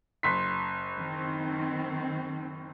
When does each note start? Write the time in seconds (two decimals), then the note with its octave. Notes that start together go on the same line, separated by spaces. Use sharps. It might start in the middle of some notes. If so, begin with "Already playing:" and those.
0.23 F#1 C6 B6
0.98 D#3 C4